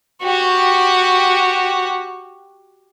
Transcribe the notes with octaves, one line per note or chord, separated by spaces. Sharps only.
F#4 G4